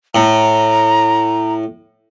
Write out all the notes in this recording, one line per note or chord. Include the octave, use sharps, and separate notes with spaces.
A2 A#5